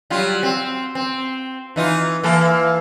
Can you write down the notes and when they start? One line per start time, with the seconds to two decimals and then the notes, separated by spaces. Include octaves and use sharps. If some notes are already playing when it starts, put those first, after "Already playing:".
0.10 F#3 G3 F4
0.43 C4
0.95 C4
1.76 E3 D#4 F4
2.23 E3 A#3 A4